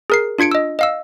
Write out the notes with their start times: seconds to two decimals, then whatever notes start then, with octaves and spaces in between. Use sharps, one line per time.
0.10 G#4 A#4 C7
0.38 D4 F4 G#6 C#7 D7
0.51 D#5 E6
0.79 D#5 F5 E6